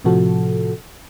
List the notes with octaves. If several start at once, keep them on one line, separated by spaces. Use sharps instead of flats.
A2 C3 F3 F#4 A4